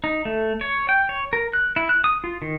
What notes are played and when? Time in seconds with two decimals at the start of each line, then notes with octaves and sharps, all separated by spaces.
0.04 D#4
0.25 A3
0.61 C#5
0.89 G5
1.09 C#5
1.33 A#4
1.53 F#6
1.76 E4
1.89 F#6
2.04 D#6
2.24 F4
2.42 D#3